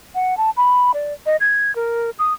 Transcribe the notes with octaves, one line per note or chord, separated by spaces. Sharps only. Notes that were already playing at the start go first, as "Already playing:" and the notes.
F#5
A5
B5
D5
D#5
G#6
A#4
D#6